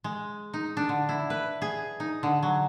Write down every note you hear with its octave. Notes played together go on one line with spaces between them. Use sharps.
G#3
D#4
D4
D3
E4
B4
G#4
D#4
D3
F#3